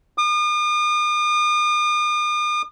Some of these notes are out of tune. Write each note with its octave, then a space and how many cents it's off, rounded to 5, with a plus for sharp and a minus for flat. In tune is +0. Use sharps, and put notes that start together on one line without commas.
D#6 -45